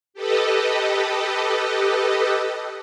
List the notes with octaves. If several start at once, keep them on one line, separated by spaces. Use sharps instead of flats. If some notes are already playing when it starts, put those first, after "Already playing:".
G4 A4 B4 D#5